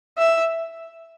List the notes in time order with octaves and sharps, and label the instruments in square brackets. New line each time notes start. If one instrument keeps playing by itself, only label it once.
[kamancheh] E5